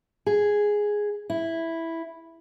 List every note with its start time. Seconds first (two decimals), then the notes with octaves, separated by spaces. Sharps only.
0.26 G#4
1.30 E4